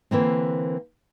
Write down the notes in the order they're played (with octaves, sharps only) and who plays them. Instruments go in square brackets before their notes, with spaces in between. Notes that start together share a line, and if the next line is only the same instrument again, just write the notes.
[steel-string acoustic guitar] D3 E3 A#3 C4